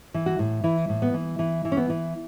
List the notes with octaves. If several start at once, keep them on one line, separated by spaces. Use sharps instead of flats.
E3
F#4
A2
E3 E4
A2
B3
E3
E3
E3
C#4
B3
E3